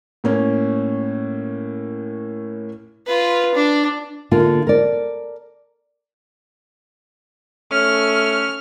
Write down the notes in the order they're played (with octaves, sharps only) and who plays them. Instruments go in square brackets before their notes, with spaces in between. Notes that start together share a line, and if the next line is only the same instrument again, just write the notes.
[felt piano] A2 A#3 C#4
[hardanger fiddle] F4 B4
D4
[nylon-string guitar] D3 A#3 F4
A#4 D5
[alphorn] A3 [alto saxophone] C#4 [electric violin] F6